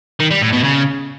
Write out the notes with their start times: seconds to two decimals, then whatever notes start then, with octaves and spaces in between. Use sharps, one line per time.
0.20 D#3
0.31 G3
0.42 A2
0.53 B2
0.64 C#3